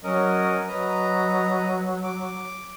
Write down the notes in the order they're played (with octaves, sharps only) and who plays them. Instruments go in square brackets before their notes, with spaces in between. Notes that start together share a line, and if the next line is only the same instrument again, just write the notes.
[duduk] F#3 [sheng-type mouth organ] C#4 A#4 D#5
[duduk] F#3 [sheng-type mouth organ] B4 D#5 A#5
[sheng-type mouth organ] D6